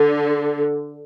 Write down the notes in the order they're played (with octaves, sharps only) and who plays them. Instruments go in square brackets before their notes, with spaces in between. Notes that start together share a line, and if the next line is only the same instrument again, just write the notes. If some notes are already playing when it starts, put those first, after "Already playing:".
Already playing: [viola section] D3